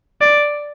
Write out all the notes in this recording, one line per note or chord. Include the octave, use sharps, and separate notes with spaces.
D5